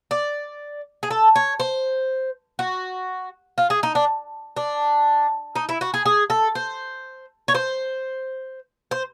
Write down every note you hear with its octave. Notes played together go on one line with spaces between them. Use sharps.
D5
G#4
A4
C#5
C5
F#4
F4
G#4
D#4
D4
D4
D#4
E4
F#4
G#4
G#4
A4
C5
C#5
C5
C5